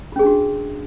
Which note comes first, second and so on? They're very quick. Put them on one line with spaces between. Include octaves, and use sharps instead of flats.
F4 C#4 G#4 D4 F#4